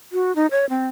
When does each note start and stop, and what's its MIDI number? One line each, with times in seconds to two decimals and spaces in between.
0.12 0.34 66
0.36 0.47 63
0.51 0.65 73
0.70 0.88 60